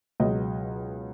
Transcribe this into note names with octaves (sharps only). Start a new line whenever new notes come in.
C#2 B2 F#3 D#5